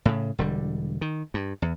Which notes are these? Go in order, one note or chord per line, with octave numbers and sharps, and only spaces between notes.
A2 C#3
E1 D3 G3
D#3
G2
E2